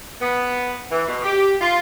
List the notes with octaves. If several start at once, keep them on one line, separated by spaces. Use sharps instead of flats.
B3
E3
B2
G4
F4